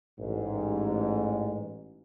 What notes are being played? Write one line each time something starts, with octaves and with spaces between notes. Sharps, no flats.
A1 G#2